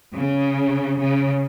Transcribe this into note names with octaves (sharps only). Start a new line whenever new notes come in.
C#3
C#3